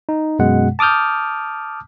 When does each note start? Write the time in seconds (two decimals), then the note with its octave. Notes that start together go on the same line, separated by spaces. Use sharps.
0.09 D#4
0.39 F#2 B2 G#3 F#5
0.79 A5 D6 D#6 F6 G6